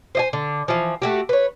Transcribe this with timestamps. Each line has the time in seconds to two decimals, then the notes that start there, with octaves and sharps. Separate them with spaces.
0.15 C5 D#5 G#5
0.33 D3
0.68 E3 F3
1.02 A3 F#4 G4
1.29 B4 C#5